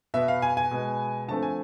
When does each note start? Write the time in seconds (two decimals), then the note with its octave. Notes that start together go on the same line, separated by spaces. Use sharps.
0.14 B2 B3 E5
0.28 F5
0.42 G#5
0.57 G#5
0.71 B2 G#3 B3
1.28 D3 F3 A3 C4 A5
1.43 G#5